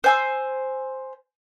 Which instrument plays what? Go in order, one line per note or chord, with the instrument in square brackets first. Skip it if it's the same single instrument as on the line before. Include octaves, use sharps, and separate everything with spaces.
[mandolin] C5 G#5 E6